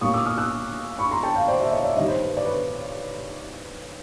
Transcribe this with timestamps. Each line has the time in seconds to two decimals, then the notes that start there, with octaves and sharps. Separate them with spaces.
0.01 A#2 G3 A#3 C#4 C#6 D#6
0.14 D6 E6
0.26 D#6 F6
0.38 E6 F#6
0.99 B5 C#6
1.11 A#5 C6
1.23 G5 A5
1.36 F5 G5
1.48 C5 D5
1.60 D5 E5
1.72 C#5 D#5
1.84 D5 E5
1.96 G2 D#3 G3 C#5 D#5
2.08 C5
2.21 B4
2.37 D5
2.45 B4 C#5